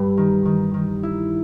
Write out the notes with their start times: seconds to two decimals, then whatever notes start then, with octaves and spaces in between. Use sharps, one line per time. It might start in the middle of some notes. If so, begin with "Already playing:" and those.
Already playing: G2 G3
0.17 D#3
0.45 D#3
0.74 D#3
1.03 E4